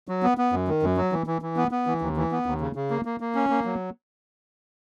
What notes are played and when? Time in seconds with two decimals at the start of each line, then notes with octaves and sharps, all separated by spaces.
0.08 F#3
0.23 B3
0.38 B3
0.53 F#2
0.68 D#3
0.83 F#2
0.97 F#3
1.12 E3
1.27 E3
1.42 E3
1.57 B3
1.71 B3
1.87 E3
2.01 D#2
2.16 E3
2.32 B3
2.46 D#2
2.61 C#3
2.76 C#3
2.90 A#3
3.05 A#3
3.20 A#3
3.35 C#4
3.50 A#3
3.65 F#3